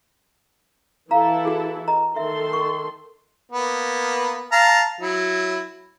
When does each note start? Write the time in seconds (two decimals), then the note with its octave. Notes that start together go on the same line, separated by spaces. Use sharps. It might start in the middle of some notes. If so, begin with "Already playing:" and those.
1.11 E3 E4 A4 F5 A#5
1.45 F#4 G#4
1.88 D#5 A#5
2.16 D#3 A4 E5 C6
2.53 C#6
3.52 A#3 B3
4.52 F5 A5 A#5
5.01 F#3 E4